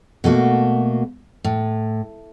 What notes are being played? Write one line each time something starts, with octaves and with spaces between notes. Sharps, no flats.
B2 A3 A#3 F#4
A2